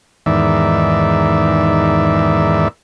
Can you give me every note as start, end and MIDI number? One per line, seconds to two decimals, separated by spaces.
0.26 2.68 40
0.26 2.68 44
0.26 2.68 51
0.26 2.68 74
0.26 2.68 76